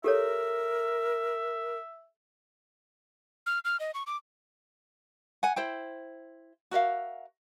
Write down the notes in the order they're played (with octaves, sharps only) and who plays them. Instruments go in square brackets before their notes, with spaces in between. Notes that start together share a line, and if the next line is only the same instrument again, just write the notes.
[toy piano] G4 A4 C#5 [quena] A#4 [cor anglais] E5
[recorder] F6
F6
D#5
C#6
D6
[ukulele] F#5 G#5
E4 C5 G5
F#4 A#4 E5 F5